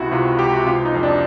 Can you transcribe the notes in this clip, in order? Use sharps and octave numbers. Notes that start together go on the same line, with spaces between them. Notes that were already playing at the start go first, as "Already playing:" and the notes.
Already playing: C#2 C3 E4 F#4
C3 F4
C#2 G4
F#4
C3 F4
D#4
F2
D4